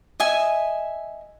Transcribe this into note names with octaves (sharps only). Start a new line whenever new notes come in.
D#5 E5 G#5